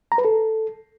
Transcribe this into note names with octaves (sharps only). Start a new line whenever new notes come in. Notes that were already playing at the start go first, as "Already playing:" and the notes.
A#5
B4
A4